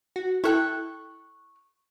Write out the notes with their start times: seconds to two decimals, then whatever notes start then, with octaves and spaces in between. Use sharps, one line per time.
0.16 F#4
0.44 E4 A4 G5 C#6 F#6